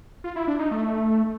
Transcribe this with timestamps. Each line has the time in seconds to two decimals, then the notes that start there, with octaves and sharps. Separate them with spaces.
0.24 F4
0.36 E4
0.48 D4
0.59 D#4
0.71 A3